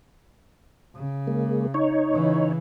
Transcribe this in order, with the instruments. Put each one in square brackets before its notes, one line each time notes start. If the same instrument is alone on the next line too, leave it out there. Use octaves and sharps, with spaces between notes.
[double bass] C#3
[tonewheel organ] G#3 A#3
D#4 C#5
[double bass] C#3 E3